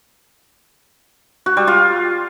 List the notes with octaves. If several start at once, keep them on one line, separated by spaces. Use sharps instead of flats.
F#4
G3
F4